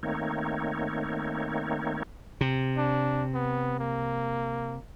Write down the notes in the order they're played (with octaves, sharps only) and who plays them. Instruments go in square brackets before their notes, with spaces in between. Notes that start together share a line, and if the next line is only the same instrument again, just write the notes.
[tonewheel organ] D#3 A3 A#3 C4 D#4 C#5
[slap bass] C3
[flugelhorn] D4
B3
A#3